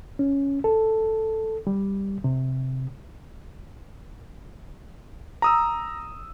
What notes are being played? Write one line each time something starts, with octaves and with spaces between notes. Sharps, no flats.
C#4
A4
G3
C3
A#5 D#6 E6